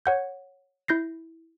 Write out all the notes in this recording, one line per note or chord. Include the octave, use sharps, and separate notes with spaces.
C#5 F#5 G6
E4 G6 A#6 C7